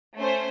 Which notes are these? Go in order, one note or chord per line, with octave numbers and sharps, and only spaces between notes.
A3 C#4 C5